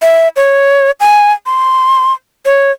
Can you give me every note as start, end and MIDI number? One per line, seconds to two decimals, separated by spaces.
0.02 0.28 76
0.36 0.91 73
1.00 1.32 80
1.46 2.13 84
2.46 2.71 73